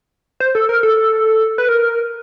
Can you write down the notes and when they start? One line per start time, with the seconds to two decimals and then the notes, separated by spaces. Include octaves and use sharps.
0.40 C5
0.55 A4
0.69 A#4
0.83 A4
1.58 B4
1.69 A#4